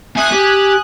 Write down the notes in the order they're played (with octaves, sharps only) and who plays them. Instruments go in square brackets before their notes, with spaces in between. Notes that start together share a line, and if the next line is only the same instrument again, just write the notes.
[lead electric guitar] A#3 E5 [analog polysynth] G#5 D#6 F#6
[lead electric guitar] G4